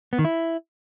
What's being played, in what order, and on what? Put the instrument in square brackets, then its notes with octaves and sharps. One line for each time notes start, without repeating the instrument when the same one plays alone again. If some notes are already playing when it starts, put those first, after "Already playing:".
[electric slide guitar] B3
D#3
E4